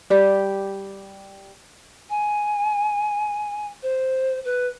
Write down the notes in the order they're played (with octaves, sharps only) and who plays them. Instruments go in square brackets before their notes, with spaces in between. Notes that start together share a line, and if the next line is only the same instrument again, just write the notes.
[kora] G3 G4
[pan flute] G#5
C5
B4